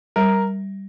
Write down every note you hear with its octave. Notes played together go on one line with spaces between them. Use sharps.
G3 A#4